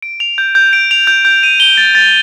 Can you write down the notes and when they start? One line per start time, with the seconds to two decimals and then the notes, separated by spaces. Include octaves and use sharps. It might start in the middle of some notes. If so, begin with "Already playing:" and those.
0.02 D7
0.20 F7
0.38 G6
0.55 G6
0.73 D7
0.91 F7
1.07 G6
1.25 G6
1.43 D#7
1.60 G7
1.77 A6
1.95 A6